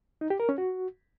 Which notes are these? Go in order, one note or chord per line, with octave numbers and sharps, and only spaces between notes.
D#4
G4
A#4
C#4
F#4